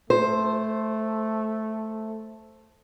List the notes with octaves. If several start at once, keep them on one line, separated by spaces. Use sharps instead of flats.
A3 C5